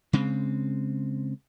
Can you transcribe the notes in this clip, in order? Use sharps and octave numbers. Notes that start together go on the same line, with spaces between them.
C#3 G#3 C4